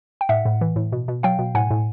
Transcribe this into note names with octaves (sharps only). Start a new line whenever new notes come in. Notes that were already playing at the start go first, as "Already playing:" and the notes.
G5
A2 E5 F#5
A2
E3
A2
B2
B2
F#3 F5 G5
B2
A2 F#5 G#5
A2